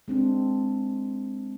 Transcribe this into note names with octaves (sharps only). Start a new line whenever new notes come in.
G#3 C4 D4